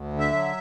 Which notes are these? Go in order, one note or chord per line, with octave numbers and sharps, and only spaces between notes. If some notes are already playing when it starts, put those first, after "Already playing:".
Already playing: D2
D3
E5
F#3